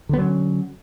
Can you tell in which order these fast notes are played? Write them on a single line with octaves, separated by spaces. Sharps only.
D3 B3 F#3 C#4